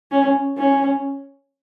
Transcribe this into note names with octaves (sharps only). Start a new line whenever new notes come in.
C#4
C#4